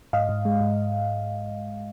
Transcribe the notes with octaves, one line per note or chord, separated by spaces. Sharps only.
G#2 D#5 F5
G#2
G#3
G#2